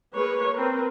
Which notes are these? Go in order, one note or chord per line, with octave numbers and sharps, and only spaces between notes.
A#3 G#4 B4 C#5
C4 A#4 B4